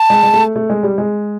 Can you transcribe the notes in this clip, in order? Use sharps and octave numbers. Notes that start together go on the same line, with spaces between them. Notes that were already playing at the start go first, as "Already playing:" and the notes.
Already playing: A5
G#3
G#3
A3
A3
G#3
G3
G#3